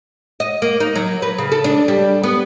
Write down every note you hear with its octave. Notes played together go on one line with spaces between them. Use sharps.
D#5
A#3
D#4
F#3
B4
C#3
A4
D4
G3
B3